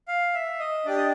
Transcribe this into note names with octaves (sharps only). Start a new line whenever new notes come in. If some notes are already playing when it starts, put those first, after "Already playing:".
F5
E5
D#5
D4 G4 D5
D#5